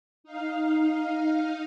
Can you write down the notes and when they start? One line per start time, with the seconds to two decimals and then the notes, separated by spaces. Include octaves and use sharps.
0.24 D#4 F5